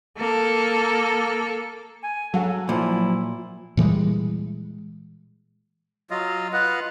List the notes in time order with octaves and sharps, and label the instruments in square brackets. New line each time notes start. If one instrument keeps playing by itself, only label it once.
[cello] A#3 A4
[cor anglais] G#5
[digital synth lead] F#3 [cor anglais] A4 [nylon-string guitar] F5 F#5 G#5
[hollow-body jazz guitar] A#2 [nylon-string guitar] F3 [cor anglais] E4
[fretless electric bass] A#2 E3 G3 G#3
[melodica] F#3 F4 D#5
F4 B4 D#5 F#5